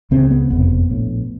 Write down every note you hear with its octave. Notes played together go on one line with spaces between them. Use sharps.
C#2 C#3 C4
B3
F#1 F2 C3 B3
A#1 A2